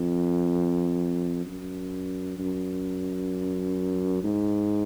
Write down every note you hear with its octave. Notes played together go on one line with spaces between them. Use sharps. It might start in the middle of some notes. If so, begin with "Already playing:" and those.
Already playing: F2
F#2
F#2
G#2